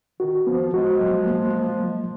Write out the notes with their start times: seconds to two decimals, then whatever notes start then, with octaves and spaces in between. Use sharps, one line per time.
0.20 D#3 F#4
0.47 F3 B3
0.73 F3 G#3 F#4
1.00 F#3
1.27 A#3
1.53 A#3
1.80 F#3